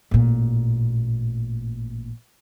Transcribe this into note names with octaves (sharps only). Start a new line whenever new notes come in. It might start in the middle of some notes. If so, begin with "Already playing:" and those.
A1 A#2